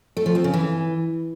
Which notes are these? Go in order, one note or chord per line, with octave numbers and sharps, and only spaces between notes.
A3
F3
C4
C#3
E3